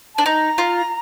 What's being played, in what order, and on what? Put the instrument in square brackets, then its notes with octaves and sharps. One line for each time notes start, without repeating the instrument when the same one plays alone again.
[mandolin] D4 [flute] A5
[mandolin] D#4 [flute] A#5
[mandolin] F4